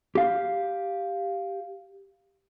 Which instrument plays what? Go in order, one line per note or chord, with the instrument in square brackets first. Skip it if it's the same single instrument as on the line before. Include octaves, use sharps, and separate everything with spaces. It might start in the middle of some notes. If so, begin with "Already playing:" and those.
[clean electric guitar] G4 F5